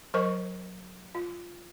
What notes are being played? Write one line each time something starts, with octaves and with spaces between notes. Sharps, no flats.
F#3 A#4 C5 D#5 C#6
F4